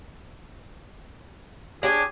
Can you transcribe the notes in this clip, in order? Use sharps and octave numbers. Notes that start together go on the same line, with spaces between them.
D4 G4 G#4 C#5